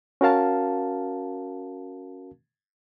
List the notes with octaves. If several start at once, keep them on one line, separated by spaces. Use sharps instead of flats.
C#4 F#4 A#4 F5 A5